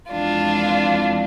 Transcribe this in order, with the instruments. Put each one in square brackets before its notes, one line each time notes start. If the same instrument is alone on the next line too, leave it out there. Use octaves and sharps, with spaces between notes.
[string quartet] F2 E3 G#3 D4 F4